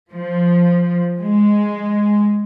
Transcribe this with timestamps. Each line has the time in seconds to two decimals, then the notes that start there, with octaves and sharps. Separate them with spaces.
0.12 F3
1.19 G#3